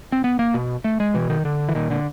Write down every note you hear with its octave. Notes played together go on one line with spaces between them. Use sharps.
C4
B3
A#3
B2
A3
G#3
B2 E3
D#3
D3
E3
A#2 D#3
D3